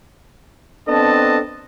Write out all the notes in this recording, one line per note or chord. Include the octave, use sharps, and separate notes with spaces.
B3 C4 D4 A4 D#5 A5